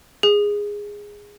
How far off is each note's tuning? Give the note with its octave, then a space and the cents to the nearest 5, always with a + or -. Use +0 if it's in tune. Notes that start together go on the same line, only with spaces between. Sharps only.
G#4 -10